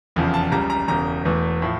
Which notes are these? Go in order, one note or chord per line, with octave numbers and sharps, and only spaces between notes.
F1 E2 C#3 F3
A5
C#2 C#3 G3 A#5
A#5
E1 E2 C#3 A#5
E1 E2 E3 A3
A2 F3